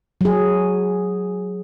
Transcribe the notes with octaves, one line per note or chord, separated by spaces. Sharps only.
F#3 G#4